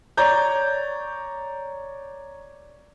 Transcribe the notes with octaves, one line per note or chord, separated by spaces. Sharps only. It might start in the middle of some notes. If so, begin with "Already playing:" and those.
C#5 D5 A#5 G6